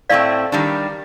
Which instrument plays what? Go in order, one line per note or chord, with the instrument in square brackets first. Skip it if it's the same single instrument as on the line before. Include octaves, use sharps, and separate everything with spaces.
[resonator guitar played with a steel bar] A2 A3 C4 [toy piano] D5 F5
[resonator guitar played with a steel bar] D#3 G3 D4